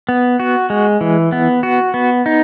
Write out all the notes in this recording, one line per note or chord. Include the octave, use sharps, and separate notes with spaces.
B3
F#4
G#3
E3
B3
F#4
B3
D#4